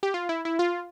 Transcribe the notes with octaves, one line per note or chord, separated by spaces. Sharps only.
G4
F4
E4
E4
F4